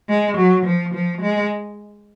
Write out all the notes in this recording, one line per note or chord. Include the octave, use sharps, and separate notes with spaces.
G#3
F#3
F3
F3
G#3